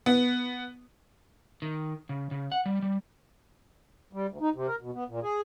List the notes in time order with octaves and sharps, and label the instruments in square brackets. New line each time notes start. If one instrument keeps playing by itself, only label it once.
[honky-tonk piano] B3
[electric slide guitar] D#3
C#3
C#3
F#5
G3
G3
[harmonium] G3
D2
D#4
C3
A#4
B2
B3
A#2
G#4